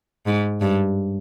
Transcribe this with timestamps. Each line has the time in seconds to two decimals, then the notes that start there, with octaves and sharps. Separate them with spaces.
0.26 G#2
0.61 G2